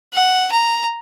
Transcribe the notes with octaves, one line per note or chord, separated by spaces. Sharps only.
F#5
A#5